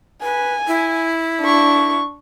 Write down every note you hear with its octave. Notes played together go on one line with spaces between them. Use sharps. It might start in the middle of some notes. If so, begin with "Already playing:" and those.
B4 G#5
E4
D4 C#6